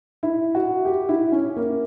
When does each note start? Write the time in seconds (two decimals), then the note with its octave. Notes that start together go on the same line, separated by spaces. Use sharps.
0.23 E4
0.55 F#4
0.85 G4
1.09 E4
1.32 C#4
1.56 A#3